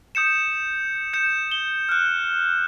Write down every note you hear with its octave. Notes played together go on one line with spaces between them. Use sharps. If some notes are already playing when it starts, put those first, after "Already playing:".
D#6 G6 C#7 E7
G6 C#7 E7
G7
F6 F#6